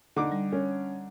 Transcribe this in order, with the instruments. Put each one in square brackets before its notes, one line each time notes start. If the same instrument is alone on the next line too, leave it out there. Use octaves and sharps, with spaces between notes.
[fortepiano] D3 D#4 D6
[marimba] G3
[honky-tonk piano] C#4